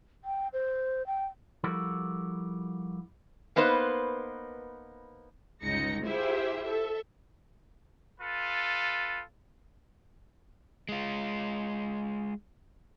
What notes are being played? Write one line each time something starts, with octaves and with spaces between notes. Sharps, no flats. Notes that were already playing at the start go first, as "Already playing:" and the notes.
G5
C5
G5
F3 G3 E4 F#4 A4 A#4
A#3 B3 D#4 B4 C5
G1 C#2 G#3 D#4 A#6 C#7
E4 F4 G4 G#4 C5 E5
A4 E5
F4 A4 B4
G#3 F4